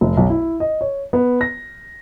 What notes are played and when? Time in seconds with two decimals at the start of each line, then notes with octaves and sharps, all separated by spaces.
0.01 F1
0.17 B1
0.30 E4
0.60 D#5
0.81 C#5
1.13 B3
1.41 A#6